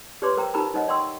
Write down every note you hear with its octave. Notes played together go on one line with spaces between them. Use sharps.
G4 B4 C#5 D5 C6 D6
A#4 C5 G5 A#5
D#4 G4 A#4 C5 A#5 B5
D#4 C5 C#5 D#5 F#5
D5 G5 C6 C#6 E6